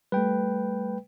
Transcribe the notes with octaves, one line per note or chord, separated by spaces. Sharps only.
G3 A3 B4 G5